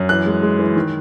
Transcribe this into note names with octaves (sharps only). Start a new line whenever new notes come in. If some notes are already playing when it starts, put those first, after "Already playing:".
Already playing: F#2
E3 F#6
G#3
G#3
E3
D#3